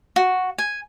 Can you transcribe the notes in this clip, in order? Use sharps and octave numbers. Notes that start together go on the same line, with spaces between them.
F#4
G#5